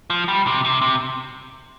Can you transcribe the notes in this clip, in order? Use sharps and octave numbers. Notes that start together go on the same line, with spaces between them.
F3
G3
C3
C3
C3